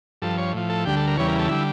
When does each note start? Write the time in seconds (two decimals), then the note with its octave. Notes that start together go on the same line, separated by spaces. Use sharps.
0.22 G2 F3 A4
0.38 C#5
0.54 A2 F3
0.70 A4
0.85 D2 D3 G3 G4
0.96 A4
1.07 A#4
1.17 E2 C#3 E3 G3 C#5
1.27 A#4
1.39 A4
1.49 D3 G3 E4